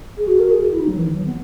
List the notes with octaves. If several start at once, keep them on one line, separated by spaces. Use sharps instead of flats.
G#4
F#4
A#4
G#4
F#4
E4
D#4
F#3
E3
D#3
F#3
B3